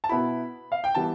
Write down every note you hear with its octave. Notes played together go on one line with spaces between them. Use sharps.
A5
B2 B3 E4 B5
F5
G5
E3 G3 B3 A5